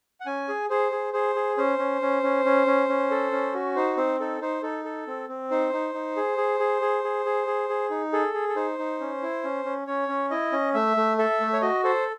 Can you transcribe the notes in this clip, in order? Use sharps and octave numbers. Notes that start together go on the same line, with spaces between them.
F#5
C#4 G#5
G#4
G#4 C5
G#4
G#4 C5
G#4
C#4 C5
C#4
C#4
C#4
C#4
C#4
C#4
A4
C#4
F#4
D#4 C5
C4 C5
D#4 A4
D#4 C5
D#4 A4
A4
C4
C4
D#4 C5
D#4
D#4
G#4
G#4
G#4
G#4
G#4
G#4
G#4
G#4
D#4
G#4 A4
G#4
A4
D#4 C5
D#4
C#4
E4
C#4
C#4
C#4 C#5
C#4
E4 D#5
C#4
A3 E5
A3
A4 E5
A3
C#5
F#4 D#5
A4 C5